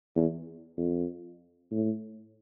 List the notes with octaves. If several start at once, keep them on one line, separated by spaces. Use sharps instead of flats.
E2
F2
A2